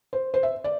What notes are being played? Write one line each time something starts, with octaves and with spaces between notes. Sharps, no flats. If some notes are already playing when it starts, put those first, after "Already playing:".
C5
C5
E5
D5